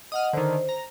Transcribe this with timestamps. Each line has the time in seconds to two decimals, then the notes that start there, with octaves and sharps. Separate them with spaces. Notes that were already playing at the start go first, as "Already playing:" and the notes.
0.12 D#5 F#5 D#6 F6
0.33 D3 D#3 C5
0.69 A#5